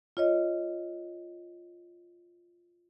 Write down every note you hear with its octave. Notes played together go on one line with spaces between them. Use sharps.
F4 C#5 D#5